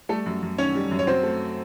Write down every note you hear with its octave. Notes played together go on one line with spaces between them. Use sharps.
G3 A3 A4
F#2
F#2
D#3 C#4 C#5
G3
F#2
C#5
F#3 C4 C5
A3